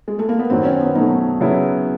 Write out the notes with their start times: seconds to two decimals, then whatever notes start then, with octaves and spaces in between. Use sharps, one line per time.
0.08 G#3
0.19 A3
0.29 A#3
0.39 B3
0.50 F#2 D#3 F#3 B3 C4
0.65 C#4
0.81 B3
0.95 B2 F#3 A3 D#4
1.40 C#3 F#3 B3 E4